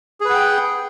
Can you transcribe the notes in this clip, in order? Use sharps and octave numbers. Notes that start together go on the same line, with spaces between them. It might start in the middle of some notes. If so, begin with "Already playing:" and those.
G#4 B4 F#5 G5